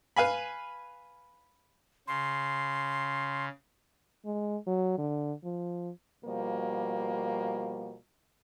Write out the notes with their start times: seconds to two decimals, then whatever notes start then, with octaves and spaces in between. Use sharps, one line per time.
0.16 B4 F5 G#5 B5
2.07 C#3 C6
4.25 G#3
4.67 F#3
4.98 D3
5.44 F3
6.24 B2 F3 G3 A#3